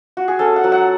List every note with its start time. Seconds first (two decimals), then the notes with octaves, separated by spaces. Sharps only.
0.17 F#4
0.28 G#4
0.39 C#4 A4
0.56 F#5
0.64 F#3
0.72 F#5